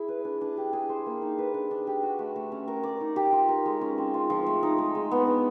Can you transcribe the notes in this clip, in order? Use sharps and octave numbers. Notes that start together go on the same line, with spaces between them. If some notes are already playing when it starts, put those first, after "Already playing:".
Already playing: E4 G#4
B4
D4
D4
G4
G#4
C5
A#3
D#4
B4
D4
D4
G4
F#4
A3
A3
C#4
A#4
D5
D#4
G4
F4
A#4
G#3
C#4
C4
F4
F3
A3
D#4
G#3
G#3
B3
D4